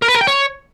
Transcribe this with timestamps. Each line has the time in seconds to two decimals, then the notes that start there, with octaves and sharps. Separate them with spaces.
0.02 A#4
0.08 B4
0.15 A#4
0.21 G5
0.27 C#5